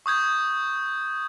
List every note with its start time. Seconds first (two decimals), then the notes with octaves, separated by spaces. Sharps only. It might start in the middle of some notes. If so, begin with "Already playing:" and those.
0.06 C#6 D#6 G6 G#6